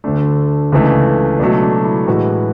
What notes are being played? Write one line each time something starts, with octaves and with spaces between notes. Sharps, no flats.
D2 D3 A3 D4
C#2 C#3 E3 A3
C#2 B2 F#3 A3 D4
D4
E4
A2 E3 G#3 F#4